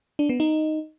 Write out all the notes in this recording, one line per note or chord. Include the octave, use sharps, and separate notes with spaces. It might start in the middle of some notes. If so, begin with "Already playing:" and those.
D4
B3
D#4